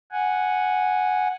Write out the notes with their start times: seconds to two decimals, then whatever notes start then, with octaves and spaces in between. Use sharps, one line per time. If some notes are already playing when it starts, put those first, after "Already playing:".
0.12 F#5 G#5